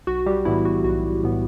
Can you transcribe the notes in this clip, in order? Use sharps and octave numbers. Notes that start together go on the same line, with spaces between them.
B1 F#4
G3 G4
A2 E3 B3 E4
F#4
B1 F#4
A2 E3 B3